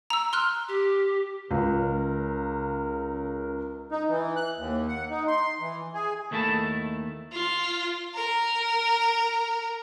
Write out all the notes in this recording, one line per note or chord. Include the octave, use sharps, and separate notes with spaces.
A#5 E6
C6 F6 F#6
G4
C#2 C#3 A#4
D#4
E3
F#6
D#2
F#5
D#4
C6
E3
G#4
D#2 D#3 A3 E4 A4 A5
F4
A#4